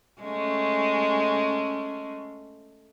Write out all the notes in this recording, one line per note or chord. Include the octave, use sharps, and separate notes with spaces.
G#3 A3 C#4